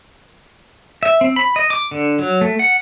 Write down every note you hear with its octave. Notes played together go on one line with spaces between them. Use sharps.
E5
C4
B5
D#5
D6
D3
F#3
A3
F#5